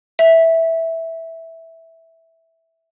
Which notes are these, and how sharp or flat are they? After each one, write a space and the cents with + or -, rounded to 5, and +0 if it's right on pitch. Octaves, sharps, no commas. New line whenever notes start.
E5 -10